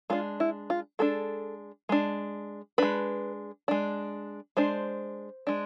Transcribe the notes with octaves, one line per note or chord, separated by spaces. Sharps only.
G#3 D4 F4
E4
F4
G#3 D4 A4
G#3 D4
G#3 D4 B4
G#3 D4
G#3 D4 C5
G#3 D4